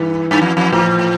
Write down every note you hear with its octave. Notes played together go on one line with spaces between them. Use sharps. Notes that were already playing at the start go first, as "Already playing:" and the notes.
Already playing: G2 E3
G2
F2
F2
A2 F3